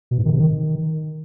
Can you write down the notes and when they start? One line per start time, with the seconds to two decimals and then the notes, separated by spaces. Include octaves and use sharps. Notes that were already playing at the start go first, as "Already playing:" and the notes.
0.11 B2
0.18 G#2
0.25 D#3
0.32 C3
0.40 D#3